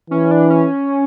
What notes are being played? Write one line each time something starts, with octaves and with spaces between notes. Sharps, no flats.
E3 C#4
D4
C#4